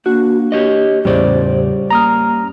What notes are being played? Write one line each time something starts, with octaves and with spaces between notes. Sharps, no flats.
A#3 D4 F#4
G4 C#5 D#5
E2 A2 C#3 G3 C#4 C5 D5
A#3 A#5 D#6 F6